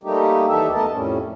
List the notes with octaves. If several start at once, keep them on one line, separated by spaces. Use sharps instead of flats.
G3 A3 A#3 D#4 G4
D#2 E3 D#4 G4 A4 E5
A3 B3 A4 A#4 D#5 A5
F2 A2 G3 C#4